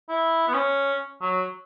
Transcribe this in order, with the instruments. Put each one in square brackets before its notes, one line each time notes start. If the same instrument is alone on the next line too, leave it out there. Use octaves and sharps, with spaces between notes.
[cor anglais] E4
B3
C#4
F#3